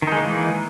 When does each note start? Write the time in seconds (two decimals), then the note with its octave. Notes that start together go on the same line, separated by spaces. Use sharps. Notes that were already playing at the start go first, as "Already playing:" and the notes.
0.02 D#3
0.07 D#4
0.12 G#3
0.17 A#3
0.22 E3